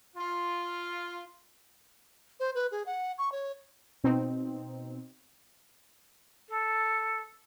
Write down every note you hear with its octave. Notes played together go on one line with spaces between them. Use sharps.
F4
C5
B4
G#4
F#5
C#6
C#5
B2 C4 D#4
A4